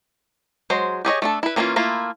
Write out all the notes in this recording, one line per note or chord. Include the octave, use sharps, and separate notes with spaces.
F#3 G#3 C5
G4 G#4 C#5 D#5
A3 D4 A4
E4 B4
E3 A#3 C#4 D#4 F4
A3 A#3 E4 F4